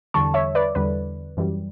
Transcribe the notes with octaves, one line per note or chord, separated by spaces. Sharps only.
E2 D3 G3 A5 C#6
C#5 E5
B4 D5
E2 D3 G3 B4
F#2 E3 G3